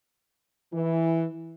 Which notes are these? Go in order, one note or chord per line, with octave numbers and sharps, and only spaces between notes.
E3